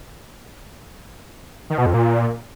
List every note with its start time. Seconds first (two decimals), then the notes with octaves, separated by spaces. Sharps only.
1.70 D#3
1.78 B2
1.86 F2
1.94 A#2